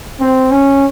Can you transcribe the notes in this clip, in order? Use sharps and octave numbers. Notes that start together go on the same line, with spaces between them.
C4
C#4